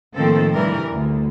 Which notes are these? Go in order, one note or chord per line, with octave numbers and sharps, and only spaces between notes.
A2 D#3 F3 A#3 C4 A4
G2 C3 E3 G3 A#4
D2